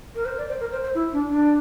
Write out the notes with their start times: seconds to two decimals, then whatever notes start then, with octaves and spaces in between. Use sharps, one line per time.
0.15 A#4
0.25 C5
0.38 D5
0.48 C5
0.60 A#4
0.71 C5
0.83 C5
0.95 E4
1.12 D4
1.30 D4